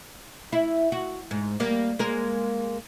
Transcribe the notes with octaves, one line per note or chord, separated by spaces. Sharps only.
E4
F#4
G#2
G3 A#3
G#3 A#3 A#4